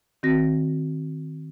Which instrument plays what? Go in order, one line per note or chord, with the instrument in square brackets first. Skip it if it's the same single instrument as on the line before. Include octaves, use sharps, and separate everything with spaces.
[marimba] D#3 C4 F#4 A#6